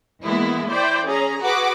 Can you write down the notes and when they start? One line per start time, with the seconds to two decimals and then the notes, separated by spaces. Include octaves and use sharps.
0.24 E3 G#3 A#3 B3 E4
0.71 E4 C5 D5 G5
1.06 C#4 G#4 A#5
1.43 F#4 G#4 B4 D6